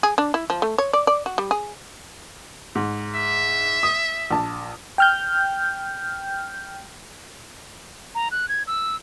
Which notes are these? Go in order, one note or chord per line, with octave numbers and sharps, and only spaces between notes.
G#4
D4
E4
F3
A3
C#5
D5
D5
F#4
G3
G#4
G#2
E5
D#6
A#1 A5
G5 F6 G6
A#5
F#6
G#6
E6